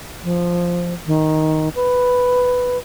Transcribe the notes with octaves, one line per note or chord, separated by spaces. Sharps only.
F3
D#3
B4